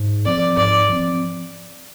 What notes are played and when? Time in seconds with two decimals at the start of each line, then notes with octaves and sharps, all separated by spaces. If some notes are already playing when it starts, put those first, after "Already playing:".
Already playing: G#2
0.25 F3 C4 D5
0.57 G#2 D5
0.89 F3 C4